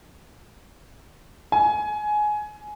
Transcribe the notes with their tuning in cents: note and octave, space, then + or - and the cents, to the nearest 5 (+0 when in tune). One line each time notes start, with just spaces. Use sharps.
G#5 +15